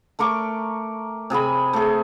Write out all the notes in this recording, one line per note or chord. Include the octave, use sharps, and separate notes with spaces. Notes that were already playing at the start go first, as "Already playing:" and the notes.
A3 A#4 C#6 D6
C3 G#4 G#5 B5
A3 G#4